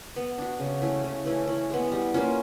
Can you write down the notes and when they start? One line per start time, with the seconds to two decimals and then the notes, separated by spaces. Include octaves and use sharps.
0.16 B3
0.38 D4 F#4
0.60 C#3
0.82 E3 A3 C#4
1.04 C#3
1.26 E3 A3 C#4
1.48 E3
1.70 G#3 B3
1.92 G3
2.14 A#3 C#4 F4